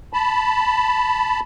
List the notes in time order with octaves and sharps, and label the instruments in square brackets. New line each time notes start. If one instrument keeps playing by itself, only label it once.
[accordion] A5 B5